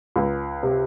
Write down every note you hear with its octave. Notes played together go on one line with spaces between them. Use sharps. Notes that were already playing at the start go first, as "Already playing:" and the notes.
C#2
C3